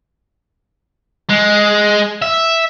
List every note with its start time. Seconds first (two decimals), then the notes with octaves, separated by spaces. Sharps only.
1.29 G#3
2.22 E5